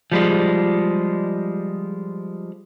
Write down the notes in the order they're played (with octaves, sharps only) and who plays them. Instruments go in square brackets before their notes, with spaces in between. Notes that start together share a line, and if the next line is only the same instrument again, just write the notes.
[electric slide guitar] F3 G3 G#3